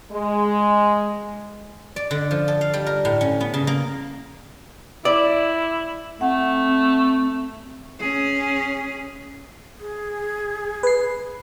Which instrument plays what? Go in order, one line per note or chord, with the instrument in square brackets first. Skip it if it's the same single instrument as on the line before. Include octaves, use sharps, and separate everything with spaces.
[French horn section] G#3
[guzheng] D5
D3
F3
A4
F5
G3
A#4
A2
C#4
B3
C#3
A#3
[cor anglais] E4 [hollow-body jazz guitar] D5
[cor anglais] A3 [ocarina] C4 [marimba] F#5
[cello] C#4 G#4
[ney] G#4
[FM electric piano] B4 C7